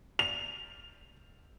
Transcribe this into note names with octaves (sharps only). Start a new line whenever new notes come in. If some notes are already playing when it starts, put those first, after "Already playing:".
F7